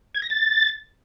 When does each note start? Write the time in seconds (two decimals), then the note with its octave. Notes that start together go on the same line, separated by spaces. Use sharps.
0.14 G#6
0.22 A#6
0.30 A6